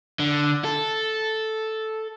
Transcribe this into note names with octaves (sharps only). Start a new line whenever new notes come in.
D3
A4